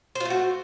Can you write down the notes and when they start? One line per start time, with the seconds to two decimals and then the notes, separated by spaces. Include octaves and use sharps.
0.15 C5
0.20 F4
0.25 A3
0.30 F#4